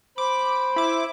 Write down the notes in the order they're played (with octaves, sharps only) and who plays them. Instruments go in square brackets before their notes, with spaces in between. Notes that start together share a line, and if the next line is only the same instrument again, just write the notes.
[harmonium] C5 [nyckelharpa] B5 [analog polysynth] D6
[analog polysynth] E4 D6